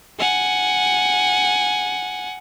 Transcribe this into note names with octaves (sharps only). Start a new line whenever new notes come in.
F#5 G#5